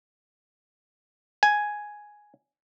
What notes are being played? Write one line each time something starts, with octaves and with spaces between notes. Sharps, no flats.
G#5